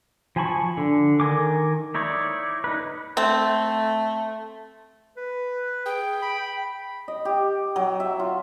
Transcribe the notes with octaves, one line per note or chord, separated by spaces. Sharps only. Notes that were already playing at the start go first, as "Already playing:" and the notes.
F3 G#5 A5 B5 C#6
D3
D#3 A#4 G#5 D6
D#4 E4 C#5 D5
D#4 B4
A3 C4
B4
G#4 G5
B5
D#5
G4
F#3
E5
F4